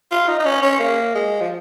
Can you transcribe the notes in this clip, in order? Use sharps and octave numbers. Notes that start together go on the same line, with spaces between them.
F4
D#4
D#4
C#4
C#4
A#3
G#3
F3